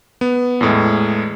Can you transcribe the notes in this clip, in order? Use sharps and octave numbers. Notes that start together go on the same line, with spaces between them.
B3
E2 A2 G#3